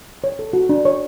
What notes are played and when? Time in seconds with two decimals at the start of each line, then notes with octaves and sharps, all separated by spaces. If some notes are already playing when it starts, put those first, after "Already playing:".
0.24 C#5
0.39 A4
0.53 F#4
0.69 D4
0.85 C#5